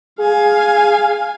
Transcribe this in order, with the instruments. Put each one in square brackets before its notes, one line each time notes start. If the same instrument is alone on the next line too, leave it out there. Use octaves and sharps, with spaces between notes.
[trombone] G#4 [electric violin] F5 G#5